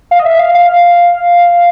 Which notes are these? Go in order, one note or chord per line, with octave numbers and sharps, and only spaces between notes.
F5
D#5
E5
F5
F5